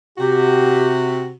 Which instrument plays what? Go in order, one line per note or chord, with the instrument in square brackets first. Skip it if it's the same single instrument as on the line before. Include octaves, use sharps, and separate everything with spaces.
[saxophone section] C3 F#4 [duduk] G4